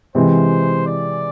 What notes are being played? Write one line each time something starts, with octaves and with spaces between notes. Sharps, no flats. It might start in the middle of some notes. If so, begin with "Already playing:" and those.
C3 E3 G#3 C4 C5
D5